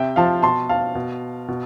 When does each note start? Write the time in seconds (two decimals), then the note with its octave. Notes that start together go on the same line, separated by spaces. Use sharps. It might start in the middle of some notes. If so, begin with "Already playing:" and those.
Already playing: C3 E5 G5
0.16 F3 F5 A5
0.42 B2 A5 C6
0.69 F5 A5
0.95 B2
1.48 B2